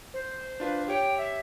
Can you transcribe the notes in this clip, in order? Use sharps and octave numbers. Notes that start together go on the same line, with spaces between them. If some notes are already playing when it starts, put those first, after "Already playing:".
C5
D4 F4 B4
G4 C#5 G5
E5